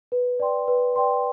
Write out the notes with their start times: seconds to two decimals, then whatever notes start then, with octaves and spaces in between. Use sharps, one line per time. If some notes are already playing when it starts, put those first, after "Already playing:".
0.12 B4
0.40 D5 G5 C6
0.68 B4
0.96 D5 G5 C6